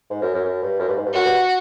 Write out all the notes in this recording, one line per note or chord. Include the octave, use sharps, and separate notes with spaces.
G#2
F#2
F#2
F#2
G2
F#2
G2
G#2
G2
F#2 F#4
G2